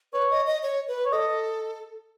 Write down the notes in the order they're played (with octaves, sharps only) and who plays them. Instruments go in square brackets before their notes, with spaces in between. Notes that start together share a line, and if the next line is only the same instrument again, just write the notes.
[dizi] B4 [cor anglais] C#5
[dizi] D#5
D#5
C#5
B4
[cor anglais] C#5
[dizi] A4 [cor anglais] D#5